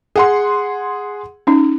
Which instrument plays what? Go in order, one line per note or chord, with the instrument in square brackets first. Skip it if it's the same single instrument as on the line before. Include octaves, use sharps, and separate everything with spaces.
[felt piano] G#4 F#5 C6
[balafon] C#4 D#4